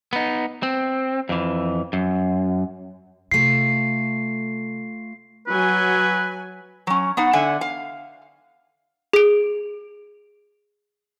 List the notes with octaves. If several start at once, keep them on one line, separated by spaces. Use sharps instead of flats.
B3 D#4
C4
F2 E3
F#2
C3 A3 F4 C7
F#3 B4 G#5
F#3 C#4
B3 D#4 F#5
D3 E5 F#5 G#5
F5
G#4 D7